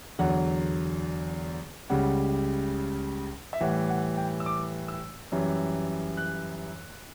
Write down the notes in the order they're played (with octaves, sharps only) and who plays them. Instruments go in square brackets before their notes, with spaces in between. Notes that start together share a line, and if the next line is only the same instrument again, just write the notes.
[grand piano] E2 D3 F#3 F#5
C#2 C#3 G3 F#5
E5
A2 E3 G3 F#5
F#5
G5
E6
D6
E6
F#2 E3 G3
F#6